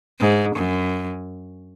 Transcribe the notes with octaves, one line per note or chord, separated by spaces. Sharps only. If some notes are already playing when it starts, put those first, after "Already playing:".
G#2
F#2